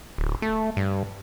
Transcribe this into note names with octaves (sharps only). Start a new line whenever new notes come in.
D1
A3
G2